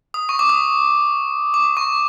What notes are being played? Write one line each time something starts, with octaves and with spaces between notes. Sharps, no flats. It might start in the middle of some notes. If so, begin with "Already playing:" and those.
D#6
C#6
D6
D#6
D6
C#6